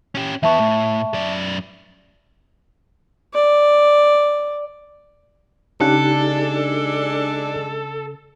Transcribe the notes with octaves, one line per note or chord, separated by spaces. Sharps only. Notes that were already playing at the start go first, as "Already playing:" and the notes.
C#4 G4
E2 B3 E5 A5 C#6
A2
F#2 D5
D5
C#3 G#3 D4 D#4 G4 A4 F#6